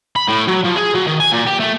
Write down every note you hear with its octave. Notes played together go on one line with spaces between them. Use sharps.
B5
A2
F#3
F3
G#4
F#3
D#3
G#5
A#2
G4
A3